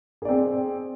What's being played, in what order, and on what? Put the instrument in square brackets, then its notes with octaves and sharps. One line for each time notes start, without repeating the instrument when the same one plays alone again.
[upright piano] G#4
D5
C4